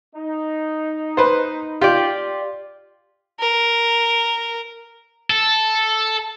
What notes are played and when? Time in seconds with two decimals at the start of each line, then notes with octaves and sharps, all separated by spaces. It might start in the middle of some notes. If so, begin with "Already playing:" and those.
0.15 D#4
1.17 B4 C5
1.81 F4 G4 D5
3.40 A#4
5.30 A4